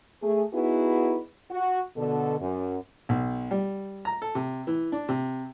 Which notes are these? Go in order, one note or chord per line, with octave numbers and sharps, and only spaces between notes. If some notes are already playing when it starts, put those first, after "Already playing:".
A3 G#4
B3 D#4 E4 F#4 G#4 B4
F#4
B2 D3 A4
F#2
B1
G3
A#5
A4
C3
E3
D4
C3